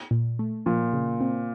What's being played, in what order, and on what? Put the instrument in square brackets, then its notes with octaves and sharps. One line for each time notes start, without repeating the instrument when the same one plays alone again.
[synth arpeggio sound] A#2
A3
[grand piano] A#2 [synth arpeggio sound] F3
[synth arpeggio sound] C#3
C4